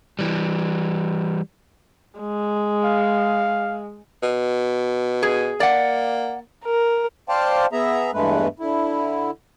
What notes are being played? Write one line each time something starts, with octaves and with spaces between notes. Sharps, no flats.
E3 G3
G#3
F5
B2
G#4
A#3 D5 F#5
A#4
C5 D5 F5 G5 A5
B3 G#4 E5 A#5
E2 G2 G#3 A3 B4
D3 E4